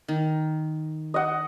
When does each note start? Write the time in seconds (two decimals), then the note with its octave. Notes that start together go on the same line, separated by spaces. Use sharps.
0.08 D#3
1.14 D#5 F#5